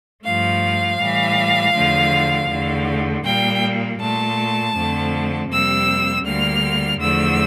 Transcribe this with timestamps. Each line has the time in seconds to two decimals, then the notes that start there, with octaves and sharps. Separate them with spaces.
0.25 G2 F3 A3 F5
1.00 A2 E3 G3
1.76 E2 D3 F3 A3
2.50 E2 D3 A3
3.25 A#2 G3 A#3 G5
4.00 A#2 A3 A5
4.76 F2 D3 F3 A3
5.51 F2 C3 G3 A#3 E6
6.26 D2 D3 G3 A#3 F6
7.01 E2 D3 F3 A3 E6